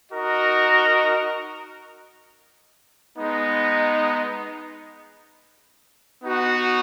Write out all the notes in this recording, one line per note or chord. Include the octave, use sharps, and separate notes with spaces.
D#4 F#4 A#4 D#5
G#3 B3 D#4
B3 D#4 F#4